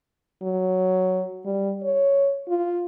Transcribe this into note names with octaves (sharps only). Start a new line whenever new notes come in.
F#3
G3
C#5
F4